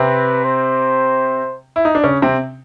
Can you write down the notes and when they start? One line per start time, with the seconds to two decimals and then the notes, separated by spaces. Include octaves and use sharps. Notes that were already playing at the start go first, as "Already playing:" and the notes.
Already playing: C3 C4 B4
0.44 C5
1.76 E4
1.85 D#4
1.95 D4
2.04 C#3 C#4
2.22 C3 C4